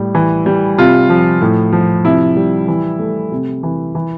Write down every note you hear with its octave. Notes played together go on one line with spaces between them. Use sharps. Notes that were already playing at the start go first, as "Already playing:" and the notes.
Already playing: A2 G3
E3
G3
C3 F4
F3
A2
F3
C3 E4
G3
E3
A3
C3
E3
E3